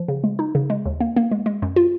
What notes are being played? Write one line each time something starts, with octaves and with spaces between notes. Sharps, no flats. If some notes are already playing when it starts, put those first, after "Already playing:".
Already playing: F3
C#3
G#3
D#4
C#3
G#3
D#2
A#3
A#3
G#3
G#3
F#2
F4